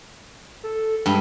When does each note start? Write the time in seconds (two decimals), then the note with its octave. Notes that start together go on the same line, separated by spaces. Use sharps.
0.64 A4
1.06 G2 G#3